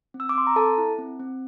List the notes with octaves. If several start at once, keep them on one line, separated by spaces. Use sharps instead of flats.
C4
E6
D6
C4 C6
A#5
A4 A5
E4
C4
C4